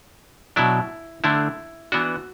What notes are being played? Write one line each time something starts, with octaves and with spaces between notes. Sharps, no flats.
B2 F#3 D4 E4
D3 A3 D4 E4
E3 B3 D4 F#4